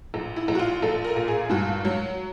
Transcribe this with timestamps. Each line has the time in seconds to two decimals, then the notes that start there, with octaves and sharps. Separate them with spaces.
0.14 A#1
0.36 E4
0.48 A#1
0.55 F#4
0.59 F4
0.82 A#1 A4
1.05 A#4
1.16 A#2
1.28 G#4
1.50 G2 F#4
1.85 F#3